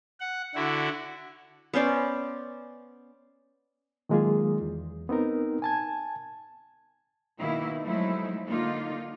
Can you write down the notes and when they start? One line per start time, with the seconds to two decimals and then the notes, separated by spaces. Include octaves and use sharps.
0.20 F#5
0.55 D3 E4 F#4
1.74 B3 C#4 C5 D5
4.09 D#3 F#3 G#3 A#3 F4 G#4
4.61 E2
5.09 B3 C4 D#4 A#4
5.62 G#5 A5 G#6
7.38 B2 D#3 A#3 E4
7.83 F3 F#3 G#3 A3 D#4 E4
8.47 D3 A#3 D#4 F4